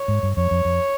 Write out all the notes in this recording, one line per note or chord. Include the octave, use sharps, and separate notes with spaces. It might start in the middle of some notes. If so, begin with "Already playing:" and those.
Already playing: C#5
G#2
G2
F2 C#5
F2
F2